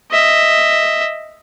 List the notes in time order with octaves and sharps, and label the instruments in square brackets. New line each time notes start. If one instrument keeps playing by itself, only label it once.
[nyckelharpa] D#5 E5